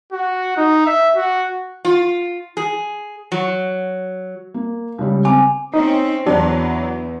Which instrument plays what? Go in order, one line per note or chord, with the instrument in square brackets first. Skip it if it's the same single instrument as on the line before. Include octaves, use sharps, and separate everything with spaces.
[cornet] F#4
D#4
E5
F#4
[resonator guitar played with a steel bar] F4
G#4
F#3
[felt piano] A#3
C#2 C#3 G3
[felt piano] C4 D6 [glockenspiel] G#5
[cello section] C4 C#4 [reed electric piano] D#4
[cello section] E2 [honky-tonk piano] F#3 [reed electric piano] D4